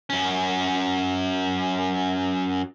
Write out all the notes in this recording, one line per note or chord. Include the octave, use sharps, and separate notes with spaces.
F#2 C#4